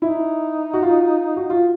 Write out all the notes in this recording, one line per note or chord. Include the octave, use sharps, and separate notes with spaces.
D#4 E4
F#4
F4
F#4
F4